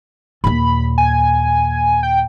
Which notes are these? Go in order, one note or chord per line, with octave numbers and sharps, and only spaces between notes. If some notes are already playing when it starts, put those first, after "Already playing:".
D#2 A#2 B5
G#5
G5